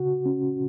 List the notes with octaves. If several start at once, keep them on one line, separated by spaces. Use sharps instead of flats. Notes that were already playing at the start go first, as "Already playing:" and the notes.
Already playing: C#3 F#4
C#4